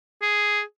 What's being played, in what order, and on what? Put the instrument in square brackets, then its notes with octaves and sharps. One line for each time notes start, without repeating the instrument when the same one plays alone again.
[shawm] G#4